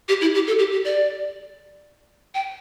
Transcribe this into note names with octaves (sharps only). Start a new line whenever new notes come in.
G4
E4
G4
A4
G4
G4
D5
G5